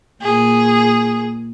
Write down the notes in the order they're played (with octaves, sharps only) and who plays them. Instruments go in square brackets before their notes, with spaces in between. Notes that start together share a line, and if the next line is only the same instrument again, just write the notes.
[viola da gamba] A#2 [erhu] G#4